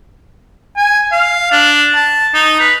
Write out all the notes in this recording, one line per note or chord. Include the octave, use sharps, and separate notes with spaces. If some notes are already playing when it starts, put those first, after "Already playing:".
G#5
F5
D4
A5
D#4
B4